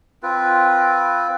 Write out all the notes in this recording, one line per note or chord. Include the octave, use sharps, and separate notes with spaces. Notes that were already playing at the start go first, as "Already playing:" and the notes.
C4 F4 B4